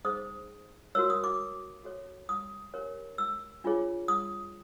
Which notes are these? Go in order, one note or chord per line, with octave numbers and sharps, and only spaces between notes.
D#4 G#4 C5 D#6
F#4 A#4 C#5 E6
D#6
D6
F#4 A4 C#5
D#6
D4 G4 A#4 C#5
E6
D4 F4 G#4 C#5
D#6